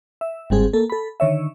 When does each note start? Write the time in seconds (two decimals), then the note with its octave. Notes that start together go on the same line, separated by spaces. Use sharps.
0.21 E5
0.50 G1 G#2 G3 C4 G#4
0.73 A#3 A4
0.90 A4 B5
1.20 D3 D#3 C#5 E5